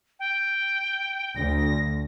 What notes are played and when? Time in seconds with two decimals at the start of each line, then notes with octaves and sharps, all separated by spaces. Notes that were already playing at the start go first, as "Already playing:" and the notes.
0.20 G5
1.36 D2 A#6